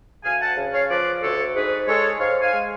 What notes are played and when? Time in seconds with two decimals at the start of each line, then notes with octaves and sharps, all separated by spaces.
0.24 D2 F5 G#5
0.41 F#5 A5
0.57 C#3
0.73 C#5 F5
0.90 F3 B4 D5
1.22 D2 A4 C#5
1.55 G#2 G#4 B4
1.88 G#3 A4 C#5
2.20 G#2 C#5 F5
2.42 F5 G#5
2.53 G#3